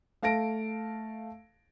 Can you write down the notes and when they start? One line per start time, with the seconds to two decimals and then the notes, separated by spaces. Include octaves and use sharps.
0.22 A3 F5 A5 A#6 D7